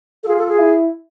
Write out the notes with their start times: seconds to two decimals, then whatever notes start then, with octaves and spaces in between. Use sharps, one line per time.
0.23 A4
0.27 F4 G#4
0.38 A4
0.48 G#4
0.59 E4